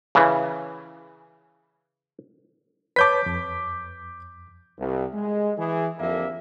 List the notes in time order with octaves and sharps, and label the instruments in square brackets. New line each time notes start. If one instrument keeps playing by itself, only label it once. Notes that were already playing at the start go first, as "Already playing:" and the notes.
[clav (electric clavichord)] C#3 E3
[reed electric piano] B4 C#5 A5 [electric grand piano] D6 G6 B6
[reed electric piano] F2
[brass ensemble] C2
G#3
E3 G#4
F2 D3 A#3 G4 A#4 E5